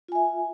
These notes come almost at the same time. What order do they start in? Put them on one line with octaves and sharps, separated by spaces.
F4 G#5 E5